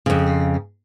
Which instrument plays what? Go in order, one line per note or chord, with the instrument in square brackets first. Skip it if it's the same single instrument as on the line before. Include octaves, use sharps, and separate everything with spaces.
[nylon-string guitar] F2 C#3